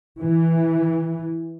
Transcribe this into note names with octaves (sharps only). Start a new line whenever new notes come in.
E3